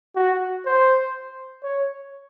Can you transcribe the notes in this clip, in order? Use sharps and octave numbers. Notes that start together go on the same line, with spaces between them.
F#4
C5
C#5